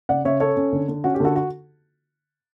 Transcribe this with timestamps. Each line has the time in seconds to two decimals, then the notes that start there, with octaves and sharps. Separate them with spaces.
0.09 C#3 D5 F#5
0.25 C#3 C#5 E5
0.40 C#4 A4 C#5
0.57 C#4
0.72 D3
0.88 D3
1.04 C#4 F#4
1.14 G4
1.20 D3 F#4 A4
1.36 F#4